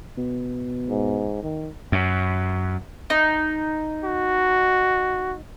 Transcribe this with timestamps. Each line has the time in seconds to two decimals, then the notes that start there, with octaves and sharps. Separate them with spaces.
0.18 B2
0.90 G#2
1.43 D#3
1.92 F#2
3.10 D#4
4.04 F#4